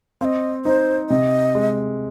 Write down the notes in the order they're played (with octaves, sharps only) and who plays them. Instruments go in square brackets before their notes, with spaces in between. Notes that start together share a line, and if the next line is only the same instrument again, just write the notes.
[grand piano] C4 [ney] F5
[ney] D#5
[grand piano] D#4 [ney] C5
[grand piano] C3 [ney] D#5
[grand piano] G#3